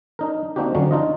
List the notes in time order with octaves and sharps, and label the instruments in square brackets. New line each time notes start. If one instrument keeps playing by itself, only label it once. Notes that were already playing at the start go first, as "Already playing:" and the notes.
[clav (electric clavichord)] D4 D#4 A#4
A#3 C4 D4 D#4 F#4 G4
D3 F3 F#3 C#4 D4
D4 D#4 F4 D#5